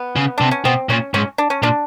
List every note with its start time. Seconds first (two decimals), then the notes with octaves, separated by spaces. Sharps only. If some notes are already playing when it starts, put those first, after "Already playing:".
Already playing: B3
0.16 C#3
0.38 C3 D4
0.51 C#4
0.65 B2 C4
0.89 A#2 C#4
1.14 G#2 C#4
1.38 D4
1.50 C#4
1.62 A#2 D4